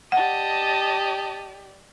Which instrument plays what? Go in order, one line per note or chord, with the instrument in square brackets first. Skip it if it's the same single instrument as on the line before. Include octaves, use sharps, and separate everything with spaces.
[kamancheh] G4 D5 [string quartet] D#5 A5 [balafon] F#5